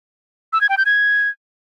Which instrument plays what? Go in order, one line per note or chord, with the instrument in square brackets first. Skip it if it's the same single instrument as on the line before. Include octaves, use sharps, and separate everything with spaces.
[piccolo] E6
G#6
G5
G6
G#6